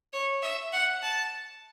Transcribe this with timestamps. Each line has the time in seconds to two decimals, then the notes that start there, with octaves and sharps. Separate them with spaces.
0.13 C#5
0.42 E5
0.73 F#5
1.02 A5